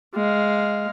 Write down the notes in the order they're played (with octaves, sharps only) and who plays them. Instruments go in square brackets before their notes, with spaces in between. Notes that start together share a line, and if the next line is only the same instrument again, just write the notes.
[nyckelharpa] G#3 F5